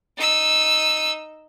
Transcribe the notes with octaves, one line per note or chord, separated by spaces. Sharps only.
D#4 E6